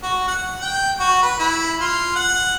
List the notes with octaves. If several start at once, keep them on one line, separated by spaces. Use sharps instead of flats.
F#4
F#5
G5
F#4
B4
E4
F4
F#5